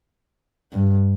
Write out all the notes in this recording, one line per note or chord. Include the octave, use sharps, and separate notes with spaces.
G2